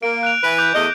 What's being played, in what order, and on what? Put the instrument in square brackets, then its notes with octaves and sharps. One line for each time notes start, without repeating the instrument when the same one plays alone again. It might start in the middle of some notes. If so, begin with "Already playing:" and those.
[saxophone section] A#3 [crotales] D7
[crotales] F#6 D7 F7
[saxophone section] E3 B4
[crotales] D6 G6 F7
[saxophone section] E2 A3 D#5